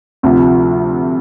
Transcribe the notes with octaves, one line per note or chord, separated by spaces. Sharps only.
D2 C3 F3